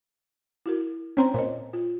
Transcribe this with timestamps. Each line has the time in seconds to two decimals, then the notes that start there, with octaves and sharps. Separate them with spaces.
0.66 E4 F#4 A#4
1.17 C4 C#4 C#5 A#5 C6
1.34 A#2 C5 C#5 D#5
1.73 F4